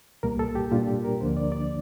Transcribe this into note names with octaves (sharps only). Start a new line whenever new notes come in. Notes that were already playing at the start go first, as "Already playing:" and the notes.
C2 A#2 G3 A#3 A#4
A4
G4
A#2 G3 D4 F4
G4
A#4
D2 D3 F3 A#3 D4 C5
D5
D5